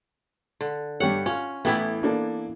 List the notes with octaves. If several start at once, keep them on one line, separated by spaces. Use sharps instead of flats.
D3
G2 G4 C#5 F#5
C#4 F4
A1 E3 A3 B3 E4 G5
A#3 D4 A4